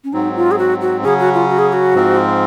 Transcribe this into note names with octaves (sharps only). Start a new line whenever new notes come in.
C#4
G#2 F#3 C4 D#4
F4
G#4
F#4
F#4
C#3 F#3 C#4 G#4
F#4
F4
F#4
G#4
G#4
F#4
G#2 F3 C4